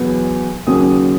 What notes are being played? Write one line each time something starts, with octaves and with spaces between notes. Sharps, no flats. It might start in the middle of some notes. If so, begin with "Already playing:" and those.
Already playing: E2 B2 F#3 B3
D#2 C#3 F#3 C#4 D#6